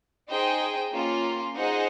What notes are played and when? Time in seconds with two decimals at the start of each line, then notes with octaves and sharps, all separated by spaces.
0.29 D#4 G#4 C5 D#5 G5
0.92 A#3 C#4 F4
1.55 D#4 G#4 C5 D#5 F#5